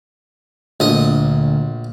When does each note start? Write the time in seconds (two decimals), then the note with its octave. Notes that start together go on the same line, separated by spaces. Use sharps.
0.80 A#1 D3 A3 D#5